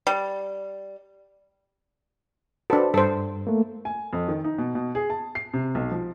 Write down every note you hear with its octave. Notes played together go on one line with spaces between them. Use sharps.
G3
D4 F#4 A4 B4 C5
G2 A4 C5
A3 A#3
G#5
F2
D#3
D#4
B2
B2
G#4
A5
C7
C3
B1
F3